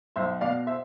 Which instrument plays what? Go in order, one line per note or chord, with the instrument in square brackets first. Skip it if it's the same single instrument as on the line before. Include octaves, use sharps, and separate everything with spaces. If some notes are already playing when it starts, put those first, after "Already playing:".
[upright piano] B1 C5 E5
B2 D5 F5
C5 E5